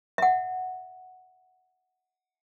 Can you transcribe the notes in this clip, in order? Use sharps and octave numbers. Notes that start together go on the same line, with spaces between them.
E5 F#5